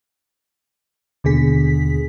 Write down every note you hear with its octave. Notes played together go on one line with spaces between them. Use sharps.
D#2 B2 D3 G#4 B6